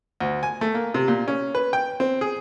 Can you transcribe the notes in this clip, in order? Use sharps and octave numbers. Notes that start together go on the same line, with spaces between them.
D2
G#5
A3
A#3
C3
A#2
C#4
B4
G5
C4
G#4